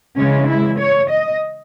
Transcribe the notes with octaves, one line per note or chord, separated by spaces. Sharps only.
C#3 E3 G#3 C#4
E4
C#5
D#5